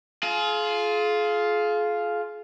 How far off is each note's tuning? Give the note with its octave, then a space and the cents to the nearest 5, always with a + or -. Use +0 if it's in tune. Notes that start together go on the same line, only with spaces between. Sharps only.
F4 +0 G#4 +40